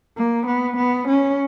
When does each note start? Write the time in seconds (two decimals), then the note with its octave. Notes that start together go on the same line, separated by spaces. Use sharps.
0.16 A#3
0.47 B3
0.77 B3
1.08 C#4